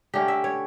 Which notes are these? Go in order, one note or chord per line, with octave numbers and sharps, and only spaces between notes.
D3 A3 C#4 G4
E5
C#5